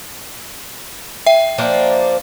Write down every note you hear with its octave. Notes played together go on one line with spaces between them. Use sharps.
E5 G5
F3 A#3 D4